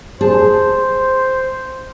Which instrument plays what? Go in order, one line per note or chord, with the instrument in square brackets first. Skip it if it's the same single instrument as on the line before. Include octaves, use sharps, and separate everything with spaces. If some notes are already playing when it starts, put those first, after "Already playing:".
[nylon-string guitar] G#4 A5 [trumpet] C5